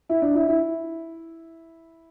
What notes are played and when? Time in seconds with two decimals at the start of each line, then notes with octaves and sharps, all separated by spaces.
0.09 E4
0.22 D4
0.35 E4
0.48 E4